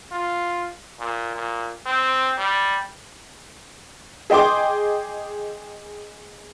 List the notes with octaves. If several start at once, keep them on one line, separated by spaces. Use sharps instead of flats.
F4
A#2
A#2
C4
G3
G#4 D#5 G5 C6 D6